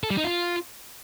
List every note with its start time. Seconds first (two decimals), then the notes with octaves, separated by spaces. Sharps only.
0.04 A4
0.10 G3
0.17 D#4
0.24 F4